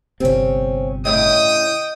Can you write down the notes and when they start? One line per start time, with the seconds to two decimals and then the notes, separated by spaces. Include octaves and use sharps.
0.20 G1 C3 C4 C#4
1.05 A2 C#3 D4 D#5 G5 D#6